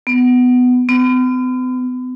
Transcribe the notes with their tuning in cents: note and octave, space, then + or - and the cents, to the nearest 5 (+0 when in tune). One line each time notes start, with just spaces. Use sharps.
B3 +15
B3 +45